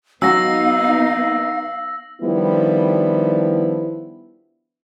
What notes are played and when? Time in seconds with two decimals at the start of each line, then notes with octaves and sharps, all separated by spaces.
0.22 F#3 B3 D#4 F#4 F5 E6 A#6
2.22 D#3 F3 G3 B3 D4 E4